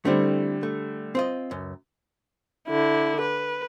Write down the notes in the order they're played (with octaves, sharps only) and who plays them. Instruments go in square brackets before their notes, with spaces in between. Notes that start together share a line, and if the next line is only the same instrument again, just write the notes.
[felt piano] D3 G3 [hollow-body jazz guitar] A3 C4 E4
[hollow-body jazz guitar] A3
C4 F4 D#5
C#2 F#2
[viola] D3 E4
B4